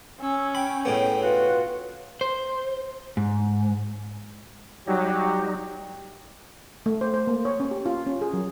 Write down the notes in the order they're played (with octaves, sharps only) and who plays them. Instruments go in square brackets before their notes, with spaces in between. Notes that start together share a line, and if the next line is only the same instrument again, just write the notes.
[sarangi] C#4 [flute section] E6
[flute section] G5 [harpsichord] B5
[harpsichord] A2 C#3 B3
[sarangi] F4 [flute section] F#4 [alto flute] B4
[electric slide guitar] C5
G#2
[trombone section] F#3 [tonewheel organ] G3 D#4 [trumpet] G4
[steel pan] A3
C5
C5
A#3
C#5
C#4
G4
F4
C#4
G#4
F#3